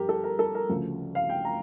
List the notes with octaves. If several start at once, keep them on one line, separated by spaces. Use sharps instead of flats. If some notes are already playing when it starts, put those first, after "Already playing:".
Already playing: G2 F3 G4 A#4
A4
A#4
A4
A#4
D2 C#3 F3
F5
G5
A#5